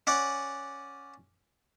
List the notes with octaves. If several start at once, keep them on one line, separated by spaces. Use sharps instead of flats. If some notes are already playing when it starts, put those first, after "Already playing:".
C#4 D5 F#5